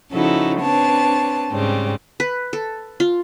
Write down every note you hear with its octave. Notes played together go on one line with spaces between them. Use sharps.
C#3 F3 D#4 E4 F#4 A4
C4 D4 B4 C#5 A5
G#2 C#3 G3 C4
B4
A4
F4